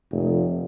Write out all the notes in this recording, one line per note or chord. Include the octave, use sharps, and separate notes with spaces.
F1